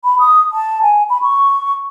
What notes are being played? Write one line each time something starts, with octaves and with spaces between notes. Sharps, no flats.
B5
D#6
A5
G#5
B5
C#6